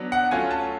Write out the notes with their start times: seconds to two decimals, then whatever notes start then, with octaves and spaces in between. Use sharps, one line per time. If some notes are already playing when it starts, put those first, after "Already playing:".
Already playing: F#3 B3 D4
0.12 F#5
0.31 F#3 A3 C#4 F4 G#5
0.51 A5